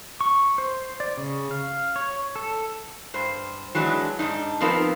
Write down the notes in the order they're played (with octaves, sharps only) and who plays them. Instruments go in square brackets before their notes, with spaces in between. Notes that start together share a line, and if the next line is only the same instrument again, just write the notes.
[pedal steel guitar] C#6
C5
D5
C#3
F5
C#5
A4
[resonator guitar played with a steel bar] G2 C5
E3 F#3 G#3 D4
G#2 B2 D4 D#4
F3 B3 C4 D#4 F4 A#4